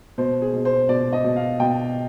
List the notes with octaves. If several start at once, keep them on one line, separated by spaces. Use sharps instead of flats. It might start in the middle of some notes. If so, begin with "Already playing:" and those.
B2 C5
G#4
B2
C5
B2 D5
D#5
B2
F5
B2 G5